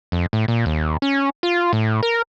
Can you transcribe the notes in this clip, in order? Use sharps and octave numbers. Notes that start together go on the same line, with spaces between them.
F2
A2
A#2
D#2
C#4
F4
A2
A#4